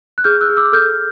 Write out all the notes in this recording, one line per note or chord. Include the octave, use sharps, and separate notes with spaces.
F#6
G#4 F6 G6
E6 F#6
G#4
D6 E6
A4 F6 G6